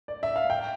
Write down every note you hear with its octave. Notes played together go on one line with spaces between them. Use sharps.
D5
E5
F5
G5